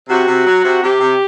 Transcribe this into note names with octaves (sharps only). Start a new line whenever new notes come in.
C3 F#4
C3
F#3
C3
C3 G4
C3